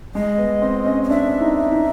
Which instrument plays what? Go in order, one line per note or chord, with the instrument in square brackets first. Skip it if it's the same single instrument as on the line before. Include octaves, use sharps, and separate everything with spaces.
[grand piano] G#3 [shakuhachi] D#5
[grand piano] B3
C4
C#4
[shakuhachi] D#5
[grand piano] D4 [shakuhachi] E5
[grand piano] D#4
D#4